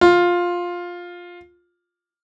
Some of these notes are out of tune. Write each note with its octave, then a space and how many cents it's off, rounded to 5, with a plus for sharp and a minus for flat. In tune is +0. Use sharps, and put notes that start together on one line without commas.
F4 +10